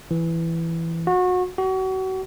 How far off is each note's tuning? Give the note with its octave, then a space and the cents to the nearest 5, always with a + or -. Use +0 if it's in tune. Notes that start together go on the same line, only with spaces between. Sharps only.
E3 +10
F#4 -25
F#4 +35